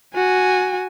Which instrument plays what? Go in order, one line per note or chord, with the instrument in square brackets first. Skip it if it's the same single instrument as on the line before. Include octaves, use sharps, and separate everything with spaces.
[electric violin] F#4 G#5